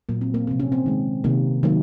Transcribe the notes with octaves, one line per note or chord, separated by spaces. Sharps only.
A#2 F#3 A#3
C4
A#3
C3 F3 A#3 C4
C#4
C4
D#3 G#3
C3 D#3 A#3
D#3 F#3 A#3